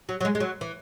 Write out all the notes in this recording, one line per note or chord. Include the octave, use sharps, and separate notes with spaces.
F#3
F#3
G#3
G#3
F#3
E3